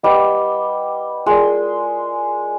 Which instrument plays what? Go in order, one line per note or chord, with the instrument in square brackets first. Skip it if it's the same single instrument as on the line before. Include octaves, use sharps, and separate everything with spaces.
[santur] G3 [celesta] B4 D#5 F#5 B5 D6
[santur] G#3 [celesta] F4 A#4 D5